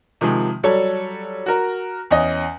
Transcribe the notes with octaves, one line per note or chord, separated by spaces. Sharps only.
C3 D#3 F3 G#3
F#3 G3 A4 C#5
F#4 A#4
E2 C#4 D#5